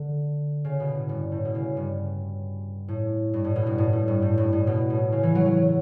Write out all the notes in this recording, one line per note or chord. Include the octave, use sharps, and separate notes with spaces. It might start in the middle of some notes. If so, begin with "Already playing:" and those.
Already playing: D3
C#3
B2
A2
G2
A2
B2
C#3
G2
A2
G2
A2
B2
G2
A2
A2
G2
A2
G2
A2
B2
A2
C#3
E3
F#3
F#3
F#3